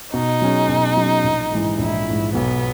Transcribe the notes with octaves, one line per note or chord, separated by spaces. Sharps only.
B2 D#4
F#3 C#4 G#4
B2
F#3 C#4 G#4
A#1
G#2 E3
A#1 E4
G#2 E3
B1 B3